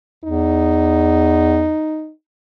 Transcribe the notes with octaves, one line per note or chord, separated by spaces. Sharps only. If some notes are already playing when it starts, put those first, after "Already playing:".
E2 D#4